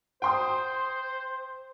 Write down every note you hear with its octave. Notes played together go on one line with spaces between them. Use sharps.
C5 G5 C6 D#6